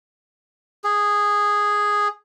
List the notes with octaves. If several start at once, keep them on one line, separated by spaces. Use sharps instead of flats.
G#4